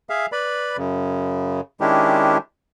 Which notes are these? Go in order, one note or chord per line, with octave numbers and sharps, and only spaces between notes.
G#4 E5 F5
B4 D5 B5
F#2 C#3
D#3 G#3 C#4 D4 E4 G4